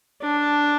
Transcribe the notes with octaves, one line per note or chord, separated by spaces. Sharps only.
D4